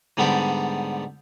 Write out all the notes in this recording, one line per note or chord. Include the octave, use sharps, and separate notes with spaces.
G#2 D3 G3 B3 D4 G4